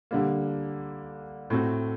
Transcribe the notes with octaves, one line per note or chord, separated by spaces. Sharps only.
D3 G3 A#3
A2 A3 C4 F#4